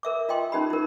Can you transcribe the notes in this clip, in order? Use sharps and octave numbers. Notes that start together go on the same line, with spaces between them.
A#4 E5 D6
F4 D#5 G5 C6
C#4 D#4 G4 B5
E4 A#4